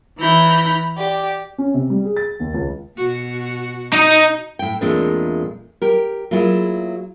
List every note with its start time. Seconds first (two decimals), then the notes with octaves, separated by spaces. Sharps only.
0.18 E3 E4 B4 A#5 B5 G6
0.97 G4 D5
1.58 C#4
1.74 C3
1.90 G3
2.04 G#4
2.16 A6
2.40 D#2
2.54 C#2
2.97 B2 F#4
3.93 D#4 D#5
4.59 A2 G5
4.81 E2 A#2 G#3 A3 C4 D4
5.82 G4 A#4
6.31 F#3 A3 A#3 E4 F4 G#4